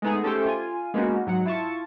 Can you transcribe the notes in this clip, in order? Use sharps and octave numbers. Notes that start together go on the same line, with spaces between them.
G#3 A3 B3 D#4 G#4
A3 C#4 G4 A4 C5 G5
F4 G#5
G#3 A#3 B3 C#4 D#4 F#4
G#2 F#3 F#5
E4 F4 A5 C#6